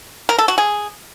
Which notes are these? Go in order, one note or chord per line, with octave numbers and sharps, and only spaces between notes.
A#4
A4
F#4
G#4